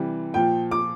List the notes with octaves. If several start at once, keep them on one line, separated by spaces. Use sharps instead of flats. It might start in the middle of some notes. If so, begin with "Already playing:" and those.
Already playing: C3 E3 G3
A#2 F3 G5
D6